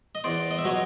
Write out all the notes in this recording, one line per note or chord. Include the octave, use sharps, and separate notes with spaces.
D#5
E2 C5 D5
D#5
E5
B2 F#3 C#5 D#5